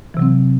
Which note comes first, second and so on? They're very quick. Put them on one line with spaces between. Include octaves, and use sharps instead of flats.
E3 C3 F#3 C4